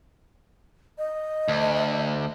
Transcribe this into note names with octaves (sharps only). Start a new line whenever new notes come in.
D#5
D2